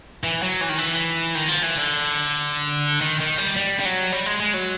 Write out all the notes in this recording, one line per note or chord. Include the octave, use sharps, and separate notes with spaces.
E3
F#3
E3
D#3
E3
D#3
F3
E3
D3
D#3
D#3
G3
G3
G3
F#3
G3
G#3
G#3
F#3